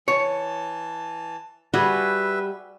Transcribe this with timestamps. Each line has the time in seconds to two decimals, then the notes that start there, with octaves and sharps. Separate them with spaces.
0.08 E3 C#5 A5
1.74 G3 F#4 G#4 B4 E5